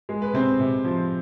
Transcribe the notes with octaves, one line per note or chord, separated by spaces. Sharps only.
G#3
B4
C3 C4 C5
C3
F3